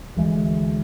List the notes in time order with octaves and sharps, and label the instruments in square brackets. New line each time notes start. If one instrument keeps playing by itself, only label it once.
[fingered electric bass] D2 E3 G#3